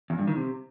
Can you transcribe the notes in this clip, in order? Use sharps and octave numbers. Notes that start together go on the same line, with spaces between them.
E2
G2
D#3
C3